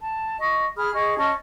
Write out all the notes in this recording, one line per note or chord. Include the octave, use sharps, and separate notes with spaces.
A5
D#5 C#6
G#4 B5 D#6 F6
G#4 D#5 C#6
C#4 D#5 A5 C#6